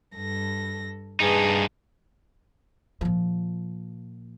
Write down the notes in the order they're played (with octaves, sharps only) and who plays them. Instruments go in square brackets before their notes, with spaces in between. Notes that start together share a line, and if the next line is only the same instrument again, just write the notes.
[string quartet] G2 A4 A#6
[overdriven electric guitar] G2 D#4 [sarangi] G#4 [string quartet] B4 A5
[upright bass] A#2 F3